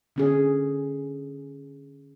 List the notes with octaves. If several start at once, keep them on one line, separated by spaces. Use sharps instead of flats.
D3 C#4 G#4